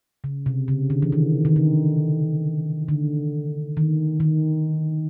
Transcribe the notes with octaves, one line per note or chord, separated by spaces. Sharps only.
C#3
C3
C#3
D3
E3
D#3
D#3
D3
D3
D#3
D#3